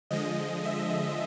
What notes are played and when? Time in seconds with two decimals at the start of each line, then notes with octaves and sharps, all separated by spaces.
0.11 D3 F3 G#3 D#5
0.65 E5